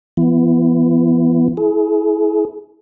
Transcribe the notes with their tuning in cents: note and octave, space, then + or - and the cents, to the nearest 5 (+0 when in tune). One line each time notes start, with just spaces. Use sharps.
E3 +40 B3 +0 E4 +30
E4 -10 G#4 +35